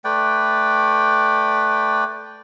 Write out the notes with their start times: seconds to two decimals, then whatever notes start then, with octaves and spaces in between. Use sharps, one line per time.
0.04 A3 B4 D5 G5